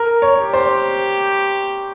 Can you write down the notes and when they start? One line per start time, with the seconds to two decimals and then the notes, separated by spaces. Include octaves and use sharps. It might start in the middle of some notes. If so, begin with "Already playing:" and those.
Already playing: A#4
0.22 C#5
0.38 G4
0.53 C5